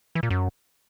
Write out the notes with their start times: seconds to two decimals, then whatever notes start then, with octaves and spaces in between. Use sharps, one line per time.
0.15 E3
0.23 A#2
0.30 F#2